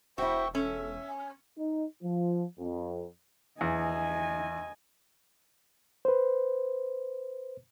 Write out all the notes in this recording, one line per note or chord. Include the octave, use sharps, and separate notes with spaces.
E1 E4 F#4 C5 E5 G5 C#6
C#4 A4 E5
G#5
D#4
F3
F2
E2 D#5 G#5
B4 C5